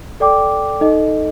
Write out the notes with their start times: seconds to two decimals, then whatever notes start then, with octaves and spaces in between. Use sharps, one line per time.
0.20 A4 D5 G5 D6
0.81 D#4 A4 D#5